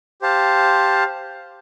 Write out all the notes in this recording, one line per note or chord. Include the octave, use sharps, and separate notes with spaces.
G4 C5 F5 A5